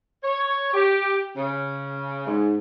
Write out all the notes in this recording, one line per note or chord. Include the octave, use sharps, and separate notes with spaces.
C#5
G4
C#3
G#2